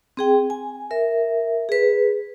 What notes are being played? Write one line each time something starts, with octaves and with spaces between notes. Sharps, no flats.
C4 G#4 G5
G#5
A#4 E5
G#4 B4